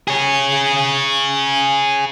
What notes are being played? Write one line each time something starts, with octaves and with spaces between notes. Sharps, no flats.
G#4 C#5